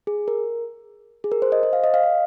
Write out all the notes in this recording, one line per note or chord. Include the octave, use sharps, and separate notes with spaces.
G#4
A#4
G#4
A#4
C5
D#5
C5
F5
D#5
F5
D#5